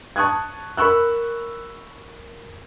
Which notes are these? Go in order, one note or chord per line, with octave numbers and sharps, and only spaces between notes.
A5 C#6 D#6 F#6 G#6
A#4 B5 C#6 E6 F#6